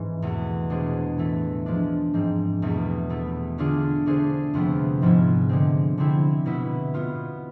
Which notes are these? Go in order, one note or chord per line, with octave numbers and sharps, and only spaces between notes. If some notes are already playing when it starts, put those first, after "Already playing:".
Already playing: G#2 E3 C4
E2 B2 A3
B2 G#3 D4 G#4 C5
A2 E3 A3
F3 G#3 D4
G#2 G#3 C4
E2 B2 A3
B2 A3 E4
D3 A3 D4 F4 G#4
D3 A3 D4 G#4 C5
F2 C3 F3 B3
G#2 F3 B3 E4
D3 G#3 C4
D3 G#3 C4 E4
B2 B3 E4 B4
B2 B3 F4